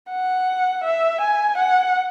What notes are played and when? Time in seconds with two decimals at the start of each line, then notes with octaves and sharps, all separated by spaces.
0.10 F#5
0.84 E5
1.21 G#5
1.58 F#5